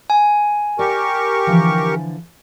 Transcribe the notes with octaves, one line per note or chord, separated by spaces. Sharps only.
G#5
G4 A#4 D5 C#6
D3 E3 F3